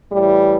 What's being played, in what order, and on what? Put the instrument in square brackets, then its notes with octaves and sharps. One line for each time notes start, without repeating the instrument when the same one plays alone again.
[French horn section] A2 E3 G3